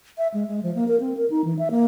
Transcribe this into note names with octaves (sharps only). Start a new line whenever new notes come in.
E5
G#3
G#3
F3
A#3
A#4
C4
A#4
D#4
E3
E5
A#3